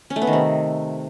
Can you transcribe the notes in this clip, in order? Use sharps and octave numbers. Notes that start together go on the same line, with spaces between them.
C#4
A3
B3
D#3
C3